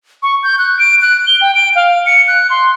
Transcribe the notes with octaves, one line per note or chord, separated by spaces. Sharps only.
C#6
G6
F#6
D7
F#6
G7
G5
D7
F5
C#7
F#6
C6